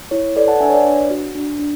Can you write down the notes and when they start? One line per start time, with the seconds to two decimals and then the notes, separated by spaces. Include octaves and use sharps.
0.11 E4 C#5
0.36 A4 B4 D5
0.48 F#5 A5
0.60 D4 E5 G#5
0.69 C#5
0.73 B4 D5
0.85 D4
1.10 F#4
1.35 D4
1.59 D4